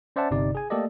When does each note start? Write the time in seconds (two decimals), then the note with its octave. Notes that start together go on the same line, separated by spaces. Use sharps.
0.16 C#4 C5 D5 E5 F#5 A5
0.31 G1 C3 D#4 D5
0.55 G#4 G#5
0.70 A3 A#3 G4 A4 D5 D#5